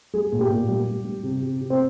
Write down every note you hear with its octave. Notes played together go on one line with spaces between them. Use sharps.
G3 G#4
A#2
G4
A#2
G3
G3
G3
C3
C3
C3
C4